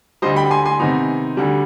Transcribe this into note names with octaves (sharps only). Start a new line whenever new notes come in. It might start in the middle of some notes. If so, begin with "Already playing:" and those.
D2 D3 G3 C5 D#5
G5 B5
G#5 C6
G#5 C6
C3 D#3 B3 D#4
D2 D3 G3